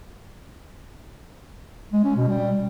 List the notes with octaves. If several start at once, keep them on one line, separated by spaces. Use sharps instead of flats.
G#3
C#4
B2
G3